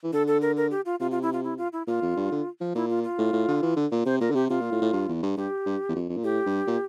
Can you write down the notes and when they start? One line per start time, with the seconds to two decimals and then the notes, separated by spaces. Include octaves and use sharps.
0.04 E3
0.13 D3 A4
0.27 A4
0.41 A#4
0.57 A#4
0.71 G4
0.85 F4
1.00 C3 F4
1.11 F4
1.22 E4
1.33 F4
1.44 E4
1.58 F4
1.73 E4
1.87 A#2 F4
2.02 F2
2.17 G2
2.32 D3
2.61 F3
2.75 A#2 E4
2.89 F4
3.04 F4
3.18 A2
3.33 A2
3.48 D3
3.63 E3
3.76 D3
3.92 A#2
4.05 C3 C5
4.20 A#2 A#4
4.30 D3
4.35 C3 G4
4.49 C3 F4
4.60 A#2
4.72 A2
4.82 A2
4.93 G2
5.08 E2
5.23 G2
5.37 G2 G4
5.66 G2
5.89 E2
5.95 F2
6.09 F2
6.17 A#2
6.24 A2 G4
6.46 G2
6.67 A#2